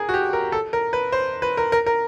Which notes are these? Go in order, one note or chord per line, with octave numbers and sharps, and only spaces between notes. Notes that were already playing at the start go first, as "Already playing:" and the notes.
Already playing: G#4 A#4
F#4
G4
A#4
A4
A#4
B4
C5
B4
A#4
A#4
A#4